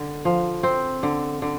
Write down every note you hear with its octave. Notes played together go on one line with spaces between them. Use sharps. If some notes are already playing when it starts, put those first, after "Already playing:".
Already playing: D3
F3
C4
D3
D3